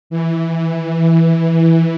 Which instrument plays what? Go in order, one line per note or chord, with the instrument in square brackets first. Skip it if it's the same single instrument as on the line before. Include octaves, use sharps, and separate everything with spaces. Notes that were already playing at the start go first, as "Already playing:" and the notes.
[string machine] E3